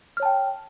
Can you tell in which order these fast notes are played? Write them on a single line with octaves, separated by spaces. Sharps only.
F6 C#5 A5 G5